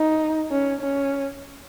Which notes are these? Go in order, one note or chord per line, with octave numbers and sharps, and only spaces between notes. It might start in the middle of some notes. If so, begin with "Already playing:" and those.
Already playing: D#4
C#4
C#4